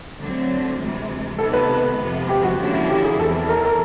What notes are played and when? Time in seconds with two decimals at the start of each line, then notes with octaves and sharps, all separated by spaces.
0.19 D3 F#3 A3 C4
0.80 D2 C3 E3 G#3
1.39 C3 D#3 G#3 B3 A4
1.54 B4
1.99 F2 C3 F3 G#3 B3
2.29 G4
2.43 F#4
2.59 D3 F3 A#3 C#4 E4
2.89 G4
3.04 G#4
3.19 E2 C3 E3 A4
3.49 A#4
3.57 A4
3.65 A#4